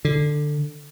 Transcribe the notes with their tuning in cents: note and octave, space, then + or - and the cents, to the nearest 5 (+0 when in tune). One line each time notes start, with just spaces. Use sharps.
D3 +10